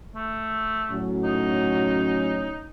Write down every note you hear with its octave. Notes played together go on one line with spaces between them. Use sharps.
A3
A2 F#3 C#4
D#4